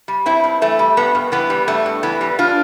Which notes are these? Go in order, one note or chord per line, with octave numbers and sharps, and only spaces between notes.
G3
G2 C4 E4
G2
E3 A3
G3
G2 B3
G2
E3 B3
G3
G2 A3
G2
E3 B3
G3
D4 F4